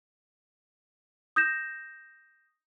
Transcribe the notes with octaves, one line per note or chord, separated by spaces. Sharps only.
D#6 G6 A#6 E7